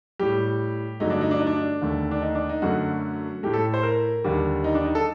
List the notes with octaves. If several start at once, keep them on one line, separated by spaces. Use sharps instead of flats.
A2 G3 G4
G2 D3 F#3 A3 D#4
D4
D#4
D4
D#4
D4
D#2 D3 A3
D4
D#4
D4
D#4
F#2 D3 A3 F#4
A2 A3 G4
A4
C5
A#4
D#2 D3 G3
D#4
D4
D#4
A4